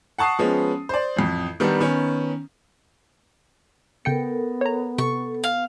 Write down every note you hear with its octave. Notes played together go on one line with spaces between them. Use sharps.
F#5 A5 C#6 D#6 C7
F3 G#3 B3 C#4
C5 D5
A1 F2
D#3 G3 B3 D4
D#3 B3 C#4
C#3 B3 A4 A#4 G5 C#7
C#5 A#5
C3 A4 C#6
F5